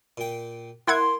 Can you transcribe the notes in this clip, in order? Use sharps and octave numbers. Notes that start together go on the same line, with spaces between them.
A#2 G5
A#3 E4 F#5 C6 G#6